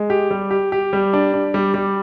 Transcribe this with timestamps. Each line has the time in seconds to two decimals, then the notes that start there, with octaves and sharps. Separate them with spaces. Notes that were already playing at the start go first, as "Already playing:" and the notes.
Already playing: G#3
0.10 G4
0.31 G3
0.51 G4
0.72 G4
0.93 G3
1.13 D4
1.34 D4
1.54 G3
1.74 G3